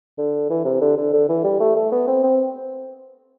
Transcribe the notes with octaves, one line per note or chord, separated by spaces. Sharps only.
D3
E3
C3
D3
D3
D3
E3
G3
A3
A3
B3
C4
C4